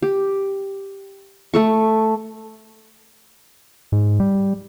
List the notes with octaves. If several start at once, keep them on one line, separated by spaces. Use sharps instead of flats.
G4
A3 A4 C#6
G#2
G3